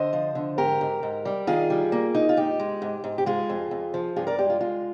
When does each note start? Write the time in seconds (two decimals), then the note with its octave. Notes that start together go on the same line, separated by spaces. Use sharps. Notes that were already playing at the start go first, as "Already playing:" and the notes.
Already playing: D3 C5 D#5
0.13 F3
0.35 D3
0.58 G#2 G4 A#4
0.81 G#2
1.03 G#2
1.25 G3
1.47 D#3 F4 G#4
1.70 G3
1.92 A#3
2.15 D#4
2.29 F4
2.37 G#2 G4
2.60 G#3
2.82 G#2
3.04 G#2
3.18 G4
3.26 G#3 F4 G#4
3.50 F2
3.71 F2
3.94 F3
4.16 G2 F4 G#4
4.27 A#4 D5
4.38 G#3 G4
4.50 F4
4.61 G#3 F4